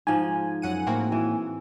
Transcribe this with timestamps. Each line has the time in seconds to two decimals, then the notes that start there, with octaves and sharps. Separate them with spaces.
0.07 G#2 F3 G#5
0.62 F#2 F#5 D#7
0.87 A2 A#3 C4 F#4
1.12 E3